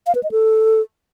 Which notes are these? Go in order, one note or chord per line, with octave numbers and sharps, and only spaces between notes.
F5
B4
D#5
A4